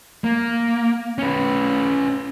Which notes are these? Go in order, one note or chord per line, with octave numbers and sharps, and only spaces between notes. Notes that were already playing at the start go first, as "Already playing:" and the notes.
A#3
C#4 B4